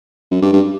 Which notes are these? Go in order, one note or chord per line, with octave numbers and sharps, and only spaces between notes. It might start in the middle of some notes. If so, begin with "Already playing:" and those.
F#2
G2
G2